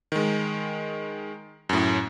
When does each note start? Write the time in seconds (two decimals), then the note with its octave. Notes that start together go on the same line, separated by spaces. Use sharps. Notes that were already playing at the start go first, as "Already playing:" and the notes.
0.12 D#3 G#3
1.69 F#2 A2